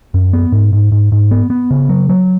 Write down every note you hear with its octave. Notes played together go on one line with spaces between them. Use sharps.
F#2
B3
G#2
G#2
G#2
G#2
B3
B3
C#3
F#3
F#3